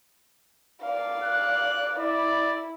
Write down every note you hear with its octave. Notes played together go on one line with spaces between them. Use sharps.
D5 F5
F#6
E4 D5